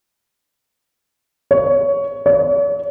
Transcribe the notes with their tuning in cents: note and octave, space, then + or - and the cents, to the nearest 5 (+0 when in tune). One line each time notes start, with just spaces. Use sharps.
C#5 +15
C#5 +45